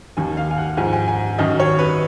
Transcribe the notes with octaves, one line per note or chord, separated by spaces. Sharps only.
D#2 D#3 G#5
F5
G#5
F#5
G#2 F3 G#5
G#5
G#5
F#2 D#3 D#5
C#5
B4